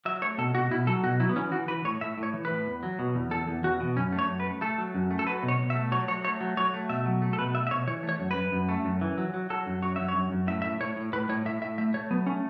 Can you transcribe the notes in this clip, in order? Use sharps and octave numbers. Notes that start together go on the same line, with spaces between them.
F#3 E5
A3 C#5
B2 A4
B2 F#4
B2 E4
F#3 A4
B2 F#4
F#3 E4
B3
E3 C#4
E3 F#4
E3 B4
A2 C#5
A2 E5
A2
C#5
E3
B4
A2
E2
F#3
B2
E2
E2 A4
E2
E2 F#4
B2
F#2 C#4
A3
C#5
F#2
B4
A3
A3 A4
F#3
F#2
A3
A4
F#3 B4
B2
C#5
B2
E5
A3
F#3 C#5
F#3 C#5
A3 C#5
F#3
F#3 C#5
A3
B2 E5
F#3
A3
A4
B2 B4
A3 E5
E5
B2 C#5
E3 C#5
A3
C#5
F#2
B4
F#2
F#2
A3
F#2
E3
F#3
F#3
F#3 A4
F#2
F#3 C#5
F#2 E5
C#5
F#2
F#2
A2 E5
A2 E5
A2 C#5
A2
A2 B4
A2 C#5
A2 E5
A2 E5
A3 E5
A3 C#5
F#3 B3
A3 C#4